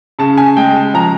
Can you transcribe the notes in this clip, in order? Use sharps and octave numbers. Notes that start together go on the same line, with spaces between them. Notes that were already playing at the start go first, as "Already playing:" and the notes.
C#3 A5
G#5
G#3 G5
A5
F3 A#5